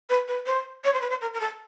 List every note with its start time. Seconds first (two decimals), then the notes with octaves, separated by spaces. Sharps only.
0.10 B4
0.28 B4
0.46 C5
0.84 C#5
0.93 C5
1.01 B4
1.10 C5
1.21 A#4
1.34 A#4
1.40 A4